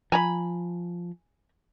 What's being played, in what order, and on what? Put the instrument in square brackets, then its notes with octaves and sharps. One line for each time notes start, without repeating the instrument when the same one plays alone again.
[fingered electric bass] F3 [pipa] G#5 A#5 B5